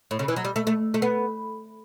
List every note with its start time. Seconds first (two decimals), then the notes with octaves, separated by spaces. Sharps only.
0.11 A2
0.19 C#3
0.28 E3
0.36 F#3
0.45 G3
0.56 A3
0.67 A3
0.94 A3
1.02 B3